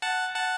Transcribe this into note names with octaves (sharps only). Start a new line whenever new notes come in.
F#5 A5
F#5 A5